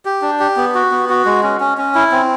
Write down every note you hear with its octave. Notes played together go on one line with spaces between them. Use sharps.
G4
D4
G4
B3
F#4
B3
F#4
G#3
C#4
C#4
C#4
E4
C4